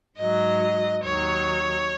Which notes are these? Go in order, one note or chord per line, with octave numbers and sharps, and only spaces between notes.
G#2 F#3 D#5
D#2 D#3 F#3 C#5